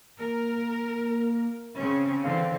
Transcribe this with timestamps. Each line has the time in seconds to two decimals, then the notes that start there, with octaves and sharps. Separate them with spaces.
0.19 A#3 A#4
1.77 C#3 C4 C#4
2.24 D3 E3 C4 F5